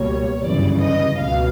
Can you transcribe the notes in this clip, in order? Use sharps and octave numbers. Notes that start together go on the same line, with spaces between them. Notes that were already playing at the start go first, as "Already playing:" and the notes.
Already playing: C#2 B2 G3 A#3 C#5
G1 F#2 C#3 E3 D5
D#5
C#2 B2 F5